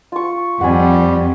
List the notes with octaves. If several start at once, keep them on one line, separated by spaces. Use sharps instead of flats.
F4 C#6
F2 G3 F#5 G#5